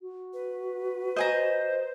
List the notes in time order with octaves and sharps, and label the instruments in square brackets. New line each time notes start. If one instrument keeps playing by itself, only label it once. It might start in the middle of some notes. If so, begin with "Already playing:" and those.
[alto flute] F#4
[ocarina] B4
[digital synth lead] C5 [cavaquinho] D#5 G#5 A#5